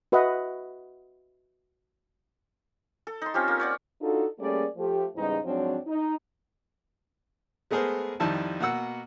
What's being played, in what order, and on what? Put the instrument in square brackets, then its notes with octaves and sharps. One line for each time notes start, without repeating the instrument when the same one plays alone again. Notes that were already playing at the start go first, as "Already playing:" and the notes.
[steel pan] F#4 B4 D#5 E5 F#5
[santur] A4
D#4 C6
C4 C#4 F4 G4
A#3
C#5 D5 F#5
[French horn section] D4 D#4 F4 F#4 A4
G3 A3 A#3 C#4 G#4 D5
F3 A3 G4
E2 G#2 C#3 G3 D#4 D#5
G#2 F3 F#3 C4 D4 C#5
D#4
[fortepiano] G#3 A3 B3 G#4 A#4 C5
F2 D#3 G3 E4 A5
B2 A#3 F#5 E6